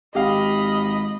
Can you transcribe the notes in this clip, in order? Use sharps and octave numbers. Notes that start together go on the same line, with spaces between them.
G#1 G4 D#5 F5 B5